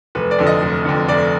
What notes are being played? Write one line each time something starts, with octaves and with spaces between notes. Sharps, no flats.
F1 B4
D5
F2 D3
D#5
F1
F2 D3
F1 D5